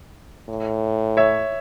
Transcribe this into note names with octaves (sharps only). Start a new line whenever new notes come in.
A2
C#5 E5